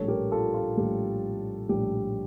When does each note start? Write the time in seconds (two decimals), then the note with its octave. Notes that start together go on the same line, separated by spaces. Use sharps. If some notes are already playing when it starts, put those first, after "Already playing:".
Already playing: A#1 A2 G3 A4 C#5
0.08 G4 A#4
0.31 F4 A4
0.54 F4
0.77 A#1 A2 G3 G4
1.69 A#1 A2 G3 G4